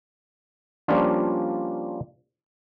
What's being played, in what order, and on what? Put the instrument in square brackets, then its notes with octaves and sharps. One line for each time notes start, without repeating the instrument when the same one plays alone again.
[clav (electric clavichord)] F3 G3 A#3 C#4 D4 F4